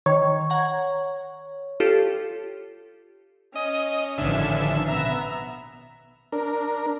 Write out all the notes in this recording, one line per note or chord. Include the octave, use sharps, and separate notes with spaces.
D#3 C#5
F#5 A#5 G#6
F4 G4 A4
C#4 D#5
A1 D3 D#3 F3 E5
B2 B3 E5 A#5
D4 A#4